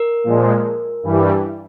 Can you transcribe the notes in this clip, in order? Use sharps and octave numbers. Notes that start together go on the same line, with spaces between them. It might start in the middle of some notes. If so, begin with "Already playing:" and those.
Already playing: A#4
A#2 F3 G#3
G2 E3 G3